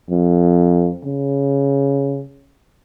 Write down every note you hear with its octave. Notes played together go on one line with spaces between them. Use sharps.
F2
C#3